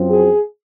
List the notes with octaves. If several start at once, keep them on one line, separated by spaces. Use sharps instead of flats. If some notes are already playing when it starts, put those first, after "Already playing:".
Already playing: F#2 F3 C4
G#4